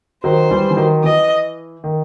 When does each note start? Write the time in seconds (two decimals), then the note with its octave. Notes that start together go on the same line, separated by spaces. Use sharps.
0.23 D#3 F#3 C5
0.51 E3 G3
0.71 E3
0.77 D#3 F#3
1.04 E3 D#5
1.84 D#3